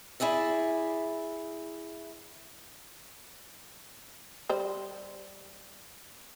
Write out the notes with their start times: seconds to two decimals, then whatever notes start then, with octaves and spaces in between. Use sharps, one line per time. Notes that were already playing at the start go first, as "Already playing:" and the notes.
0.20 E4 G#4 D5 E5
4.49 G3 C5